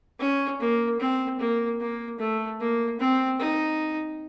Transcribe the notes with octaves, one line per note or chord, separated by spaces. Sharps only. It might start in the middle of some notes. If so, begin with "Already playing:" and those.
C#4
A#3
C4
A#3
A#3
A3
A#3
C4
D#4